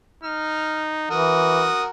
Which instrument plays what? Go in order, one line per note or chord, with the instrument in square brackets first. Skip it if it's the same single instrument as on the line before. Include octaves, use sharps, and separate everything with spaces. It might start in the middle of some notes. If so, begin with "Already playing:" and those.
[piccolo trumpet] D#4 [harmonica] F6
[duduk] E3 [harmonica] F#4 A#4 [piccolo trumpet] D#6